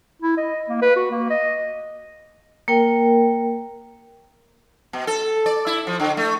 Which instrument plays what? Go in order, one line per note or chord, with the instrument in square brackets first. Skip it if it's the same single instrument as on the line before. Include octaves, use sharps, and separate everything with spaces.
[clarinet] E4
D#5
A#3
B4
F#4
A#3
D#5
[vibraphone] A#3 A#4 G5
[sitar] B2
A4
D5
E4
F3
D3
A3